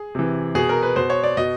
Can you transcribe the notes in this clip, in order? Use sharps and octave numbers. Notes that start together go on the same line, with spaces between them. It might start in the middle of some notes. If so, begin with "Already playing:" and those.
Already playing: G#4
C3 E3
B2 G#4
A#4
B4
B2 C5
C#5
D5
B2 D#5